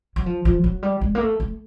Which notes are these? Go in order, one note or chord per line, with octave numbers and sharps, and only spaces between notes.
F#3
F3
F3
F#3
G3
G#3
A#3
A3
A3